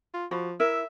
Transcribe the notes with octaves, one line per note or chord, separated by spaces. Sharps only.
F4
F3 F#4 B5
E4 A#4 E5